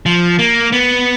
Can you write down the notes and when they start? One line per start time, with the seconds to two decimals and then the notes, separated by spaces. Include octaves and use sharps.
0.06 F3
0.39 A#3
0.72 B3